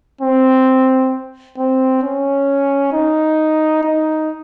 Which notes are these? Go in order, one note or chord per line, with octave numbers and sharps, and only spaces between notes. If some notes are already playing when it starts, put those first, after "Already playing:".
C4
C4
C#4
D#4
D#4